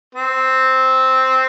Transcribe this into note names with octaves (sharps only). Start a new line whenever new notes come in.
C4